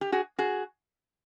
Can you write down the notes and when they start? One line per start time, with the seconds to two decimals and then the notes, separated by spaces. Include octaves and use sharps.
0.01 G4
0.12 F#4 G#4
0.38 F#4 G#4